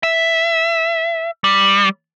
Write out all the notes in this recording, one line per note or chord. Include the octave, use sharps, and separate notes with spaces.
E5
G3